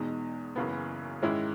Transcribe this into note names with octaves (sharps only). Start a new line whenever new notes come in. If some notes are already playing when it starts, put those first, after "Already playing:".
Already playing: E2 B2 G#3 D#4
F#1 F#2 C#3 E3 B3
G#2 D#3 G#3 C#4 E4